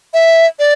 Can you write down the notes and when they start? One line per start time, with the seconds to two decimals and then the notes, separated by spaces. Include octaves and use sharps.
0.14 E5
0.59 D5